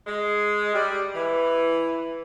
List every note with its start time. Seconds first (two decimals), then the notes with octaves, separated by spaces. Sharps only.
0.06 G#3
0.74 G3
1.14 E3